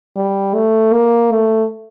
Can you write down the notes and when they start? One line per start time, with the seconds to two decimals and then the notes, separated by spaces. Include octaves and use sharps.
0.16 G3
0.55 A3
0.93 A#3
1.32 A3